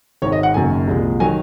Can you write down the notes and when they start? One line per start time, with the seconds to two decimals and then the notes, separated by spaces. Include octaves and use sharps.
0.22 G#1 G#2 D#3 G#3 C#5
0.32 D#5
0.43 F#5
0.54 F#1 F#2 D#3 G#5
0.87 C2 A#2 F3 G#3
1.20 D#3 F#3 G#5